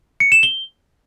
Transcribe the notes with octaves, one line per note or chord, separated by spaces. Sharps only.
C#7
E7
G7